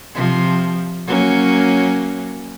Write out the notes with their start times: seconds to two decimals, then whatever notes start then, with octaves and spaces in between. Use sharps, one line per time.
0.14 C3 F3
1.07 F#3 A#3 C#4